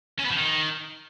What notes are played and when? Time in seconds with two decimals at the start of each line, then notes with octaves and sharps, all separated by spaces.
0.20 C#4
0.25 B3
0.31 F3
0.37 D#3